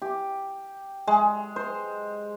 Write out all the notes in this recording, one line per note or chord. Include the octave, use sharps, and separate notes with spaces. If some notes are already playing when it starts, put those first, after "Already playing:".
G4
G#3
C5